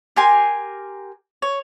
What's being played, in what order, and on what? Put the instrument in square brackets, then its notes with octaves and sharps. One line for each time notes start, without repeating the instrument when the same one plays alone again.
[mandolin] G4 A#4 G#5 C6
C#5